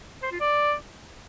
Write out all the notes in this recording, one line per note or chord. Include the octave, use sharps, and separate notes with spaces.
C5
F4
D5